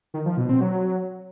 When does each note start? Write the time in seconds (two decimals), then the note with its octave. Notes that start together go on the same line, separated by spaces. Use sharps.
0.14 D#3
0.26 F3
0.37 B2
0.49 C4
0.61 F#3